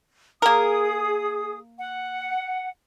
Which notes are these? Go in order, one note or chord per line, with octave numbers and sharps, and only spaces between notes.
A#3 G#4 A#4 D#6
F#5